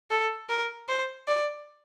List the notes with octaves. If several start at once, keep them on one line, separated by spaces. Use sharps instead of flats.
A4
A#4
C5
D5